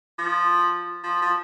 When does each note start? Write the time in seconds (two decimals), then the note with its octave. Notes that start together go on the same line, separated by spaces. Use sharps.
0.19 F3
1.03 F3
1.22 F3